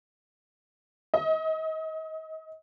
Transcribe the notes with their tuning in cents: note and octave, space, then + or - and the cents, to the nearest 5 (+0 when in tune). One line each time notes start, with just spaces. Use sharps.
D#5 +30